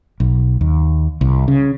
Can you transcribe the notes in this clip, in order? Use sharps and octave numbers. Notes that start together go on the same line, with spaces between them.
B1
D#2
C2
C#3